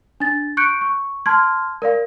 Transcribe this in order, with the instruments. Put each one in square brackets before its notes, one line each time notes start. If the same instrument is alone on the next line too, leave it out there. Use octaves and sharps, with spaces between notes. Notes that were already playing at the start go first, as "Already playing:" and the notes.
[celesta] D4 A6
C#6 F#6 G6 C#7 D7
C#6
A5 C6 F6 G#6
A#4 D5 F5